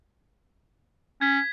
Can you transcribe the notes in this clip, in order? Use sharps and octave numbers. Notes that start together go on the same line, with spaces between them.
C#4 G#6 B6